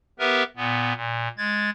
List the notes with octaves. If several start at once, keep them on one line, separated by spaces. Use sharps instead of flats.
B3 G4 A#4 B4 E5
A#2 B3
A#2
G#3 G#6 A6